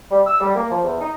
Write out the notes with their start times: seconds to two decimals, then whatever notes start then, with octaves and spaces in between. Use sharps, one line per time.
0.11 G3
0.27 E6
0.40 G3
0.56 A#3
0.70 F3
0.84 E2
1.01 D#4